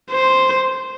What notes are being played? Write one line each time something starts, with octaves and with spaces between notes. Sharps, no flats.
C5